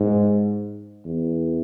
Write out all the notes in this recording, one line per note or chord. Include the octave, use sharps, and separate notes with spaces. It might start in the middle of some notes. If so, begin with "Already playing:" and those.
Already playing: G#2
E2